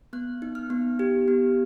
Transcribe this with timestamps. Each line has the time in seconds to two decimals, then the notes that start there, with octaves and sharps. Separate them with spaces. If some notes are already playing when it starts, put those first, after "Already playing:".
0.13 B3 F#6
0.42 D#4
0.55 F6
0.70 B3
0.99 G4
1.28 B3